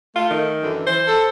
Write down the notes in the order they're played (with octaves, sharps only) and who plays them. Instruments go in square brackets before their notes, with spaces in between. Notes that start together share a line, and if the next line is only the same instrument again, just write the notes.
[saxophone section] A3 [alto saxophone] F4
[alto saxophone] D#3
[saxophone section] F#2 D3 E3
[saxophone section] E3 [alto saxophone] C5
[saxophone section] A4